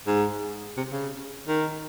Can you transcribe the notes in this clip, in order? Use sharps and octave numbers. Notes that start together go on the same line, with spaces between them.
G#2
C3
C#3
D#3